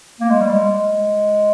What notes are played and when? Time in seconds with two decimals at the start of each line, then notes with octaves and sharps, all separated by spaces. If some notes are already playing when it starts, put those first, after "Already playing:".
0.20 A#3
0.30 G#3
0.41 G3
0.51 G#3